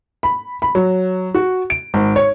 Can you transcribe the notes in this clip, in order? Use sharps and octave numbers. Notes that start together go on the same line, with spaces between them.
B5
B5
F#3
F#4
D7
G#1
C#5